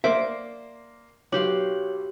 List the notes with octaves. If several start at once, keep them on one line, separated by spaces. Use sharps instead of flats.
A#3 C5 D5 E5 D6
B1 F#4 G4 C#5 F5 D6 F#7